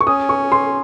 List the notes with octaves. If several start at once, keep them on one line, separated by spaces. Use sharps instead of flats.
C#6
C#4 D#6
C#6
C6